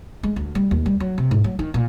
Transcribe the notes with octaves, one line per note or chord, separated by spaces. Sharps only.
G#3
D2
G3
D#2
G3
F#3
C3
G#2
F#3
D#3
A#2